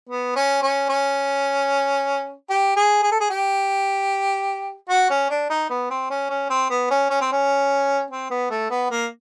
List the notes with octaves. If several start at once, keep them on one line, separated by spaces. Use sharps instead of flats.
B3
C#4
C#4
C#4
G4
G#4
G#4
A4
G#4
G4
F#4
C#4
D4
D#4
B3
C4
C#4
C#4
C4
B3
C#4
C#4
C4
C#4
C4
B3
A3
B3
A#3